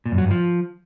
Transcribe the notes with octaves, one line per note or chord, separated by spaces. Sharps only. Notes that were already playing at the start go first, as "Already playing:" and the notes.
A#2
F#2
F#3
G2
F3